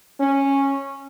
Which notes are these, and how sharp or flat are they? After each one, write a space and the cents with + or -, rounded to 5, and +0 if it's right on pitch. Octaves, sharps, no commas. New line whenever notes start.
C#4 -10